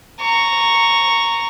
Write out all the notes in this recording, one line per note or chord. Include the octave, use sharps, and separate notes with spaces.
A#5 C#6